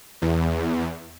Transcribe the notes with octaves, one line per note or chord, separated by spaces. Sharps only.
E2